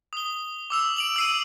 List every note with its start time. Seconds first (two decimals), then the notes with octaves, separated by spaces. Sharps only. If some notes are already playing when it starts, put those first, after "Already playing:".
0.13 D#6 G7
0.70 D6 E6 F7
0.96 D7 F7 F#7
1.16 E6 C7 D#7